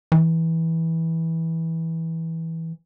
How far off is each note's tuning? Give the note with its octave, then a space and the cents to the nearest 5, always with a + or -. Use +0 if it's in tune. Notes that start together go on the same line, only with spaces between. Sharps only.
E3 -15